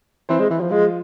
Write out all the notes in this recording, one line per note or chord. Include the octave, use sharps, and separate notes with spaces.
E3 C4 C5
G#3
E3
F3
F3 G#3 F4